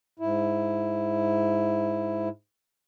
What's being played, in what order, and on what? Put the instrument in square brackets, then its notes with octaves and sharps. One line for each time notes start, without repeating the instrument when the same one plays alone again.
[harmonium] G#2 E4